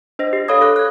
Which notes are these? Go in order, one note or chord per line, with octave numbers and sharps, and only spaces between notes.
D4 C5 D#5 A#6
G4
A4 C#5 F5 B5 D#6 G#6
A4 D6 F#6
F#6 G#6